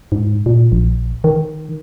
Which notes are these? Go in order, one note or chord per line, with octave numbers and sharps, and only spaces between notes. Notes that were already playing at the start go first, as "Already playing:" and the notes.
G#2
A#2
A#1
D#3